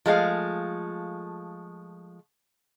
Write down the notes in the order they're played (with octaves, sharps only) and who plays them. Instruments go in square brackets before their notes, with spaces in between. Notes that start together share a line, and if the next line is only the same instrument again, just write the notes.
[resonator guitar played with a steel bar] F3 G#3 A3 F5